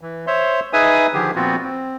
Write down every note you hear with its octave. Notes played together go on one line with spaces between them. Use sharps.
E3
C5 C#5 E5 C6
D#4 G#4 B4 E5 G#5 D#6
D3 D#3 F3 G4 G#4
A#2 F3 B3 C4 F4 F#4
C4